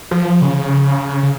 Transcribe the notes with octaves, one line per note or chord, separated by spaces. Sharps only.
F3
C#3
C#3